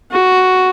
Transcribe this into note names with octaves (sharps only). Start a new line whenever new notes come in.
F#4